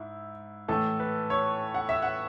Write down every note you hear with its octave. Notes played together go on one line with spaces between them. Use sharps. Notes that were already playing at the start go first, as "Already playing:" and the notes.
Already playing: G#2 E4
A2 E3 A3 A4
B4
C#5
F#5
E5
F#5